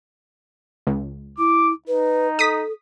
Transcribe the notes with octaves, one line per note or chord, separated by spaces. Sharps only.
C#2
E4 D6
D#4 B4
A4 D#6 B6